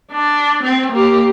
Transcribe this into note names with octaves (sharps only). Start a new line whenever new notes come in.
D4
C4
A#3 G4